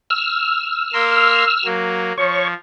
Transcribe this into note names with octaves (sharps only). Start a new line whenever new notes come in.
E6 F6
A#3 A#4 C6
F#3 A#3
F3 C#5 C#6